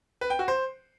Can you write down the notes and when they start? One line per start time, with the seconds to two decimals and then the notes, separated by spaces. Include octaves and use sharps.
0.21 B4
0.30 G5
0.39 F#4
0.48 C5